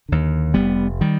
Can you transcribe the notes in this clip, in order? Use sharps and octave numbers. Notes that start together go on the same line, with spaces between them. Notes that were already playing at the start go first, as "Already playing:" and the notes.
D#2 D3
F1 G3 B3
D#3 G3